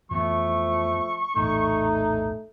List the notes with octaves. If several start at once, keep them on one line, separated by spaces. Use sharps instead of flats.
F2 E3 F3 A3 B3 C#6
A#1 E2 A2 A3 D#4